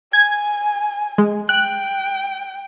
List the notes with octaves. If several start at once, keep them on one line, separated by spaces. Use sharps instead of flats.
G#5 G#6
G#3
G5 F#6